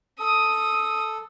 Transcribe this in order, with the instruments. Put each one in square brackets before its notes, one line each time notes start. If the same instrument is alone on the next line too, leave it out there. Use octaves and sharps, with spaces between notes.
[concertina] A4 [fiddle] D#6